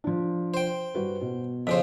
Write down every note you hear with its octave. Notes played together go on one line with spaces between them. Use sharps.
F3 D4
C5 G5
G2 F#4 B4
B2
F2 C#3 C5 B6